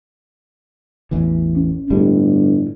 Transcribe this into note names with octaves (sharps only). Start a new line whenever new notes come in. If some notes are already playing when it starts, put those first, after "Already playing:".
A1 E2 E3
C#4
G1 A2 G3 G#3